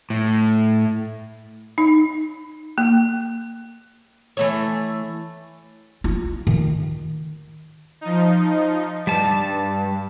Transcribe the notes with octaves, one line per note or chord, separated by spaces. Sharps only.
A2
D#4
A#3
E3 A3 C#5
F4
D#3
F3 D#4
G2 G3 A5